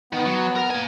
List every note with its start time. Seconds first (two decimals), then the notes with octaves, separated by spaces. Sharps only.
0.13 D#3 B3
0.26 F#3
0.57 A#4 A#5
0.71 A#3 G#5